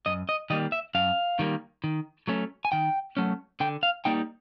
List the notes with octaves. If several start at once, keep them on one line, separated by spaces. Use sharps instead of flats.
F#2 D#5
D#5
D#3 G3 A#3 D#5
E5
F#2 F5
D#3 G3 A#3
D#3
F#3 A3 C#4
G#5
D#3 G5
F#3 A3 C#4
D3 G5
F5
G3 A#3 D#4 G5